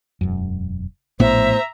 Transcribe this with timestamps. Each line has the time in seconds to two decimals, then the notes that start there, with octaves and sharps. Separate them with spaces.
0.21 E1 F#2
1.20 A#1 A2 B3 C5 E5 A#5